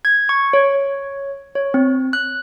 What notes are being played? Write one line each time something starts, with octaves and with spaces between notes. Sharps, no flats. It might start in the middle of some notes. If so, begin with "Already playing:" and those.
G#6
C#6
C#5
C#5
C4
F#6